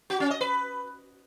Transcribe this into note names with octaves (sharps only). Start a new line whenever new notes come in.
F#4
C#4
D#5
B4